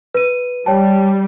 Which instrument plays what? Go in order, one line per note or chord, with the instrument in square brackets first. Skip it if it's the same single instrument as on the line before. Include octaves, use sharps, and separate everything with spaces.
[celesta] B4 D#7
[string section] G3 [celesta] C#5 G5 A5